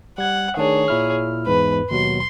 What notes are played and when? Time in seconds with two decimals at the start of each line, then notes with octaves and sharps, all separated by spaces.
0.18 G3 F#5 G#6
0.57 D#3 A3 D4 G#4 C#5
0.88 A#2 E4 F6
1.47 E2 G#2 B4
1.91 D#2 B2 F#3 C6